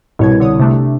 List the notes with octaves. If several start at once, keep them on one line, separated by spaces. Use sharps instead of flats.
C2 B2 C#5 G#6
D3 C#5 D#6
C3 A3 D4